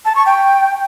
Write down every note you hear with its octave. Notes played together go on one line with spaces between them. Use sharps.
A5
C#6
G5